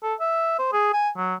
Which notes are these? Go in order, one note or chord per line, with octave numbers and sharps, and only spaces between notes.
A4
E5
C5
G#4
G#5
F#3